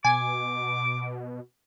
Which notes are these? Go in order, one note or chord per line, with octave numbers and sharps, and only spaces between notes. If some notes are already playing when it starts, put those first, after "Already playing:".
B2 G#5 D6